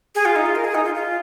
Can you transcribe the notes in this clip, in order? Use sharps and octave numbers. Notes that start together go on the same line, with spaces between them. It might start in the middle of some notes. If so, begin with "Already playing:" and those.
G#4
F4
D#4
F4
A#4
G#4
D#4
F4
F4